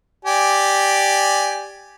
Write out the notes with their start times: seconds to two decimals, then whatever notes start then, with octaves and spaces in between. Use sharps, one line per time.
0.25 G4 D5 G#5